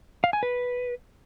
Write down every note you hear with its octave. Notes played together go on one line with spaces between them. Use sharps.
F5
G#5
B4